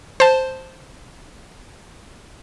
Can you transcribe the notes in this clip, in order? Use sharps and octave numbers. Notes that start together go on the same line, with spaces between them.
C5 A5